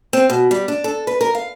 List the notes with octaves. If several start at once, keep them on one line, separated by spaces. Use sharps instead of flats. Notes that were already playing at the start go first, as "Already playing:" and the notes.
C4
B2
G3
D4
A4
B4
A#4
F5